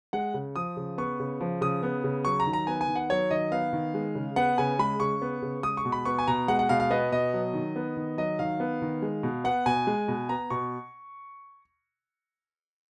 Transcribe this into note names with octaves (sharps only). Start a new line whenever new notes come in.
G#3 F#5
C#3
F3 D#6
C#3
B3 C#6
C#3
F3
C#3 D#6
B3
C#3
F#3 C#6
A#5
D#3
A#5
B3 G#5
G#5
D#3
F#5
F#3 C#5
D#3 D#5
B3 F5
D#3
G#3
C#3
B3 F#5
C#3 G#5
G#3 B5
C#3 C#6
B3
C#3
G#3 D#6
C#6
B2
B5
B3 C#6
G#5
B2 A#5
G#3 F#5
F#5
B2 F5
F5
B3 D#5
B2 D#5
F#3
D#3
B3
D#3
F#3 D#5
D#3 F5
B3
D#3
G#3
B2
B3 F#5
B2 G#5
G#3
B2
B3 A#5
B2 C#6